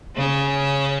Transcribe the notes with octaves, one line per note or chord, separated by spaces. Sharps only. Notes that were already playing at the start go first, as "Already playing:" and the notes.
C#3 C#4